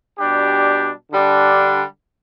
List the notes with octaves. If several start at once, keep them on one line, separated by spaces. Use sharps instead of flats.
B2 G3 D4 G4
D3 G3 D4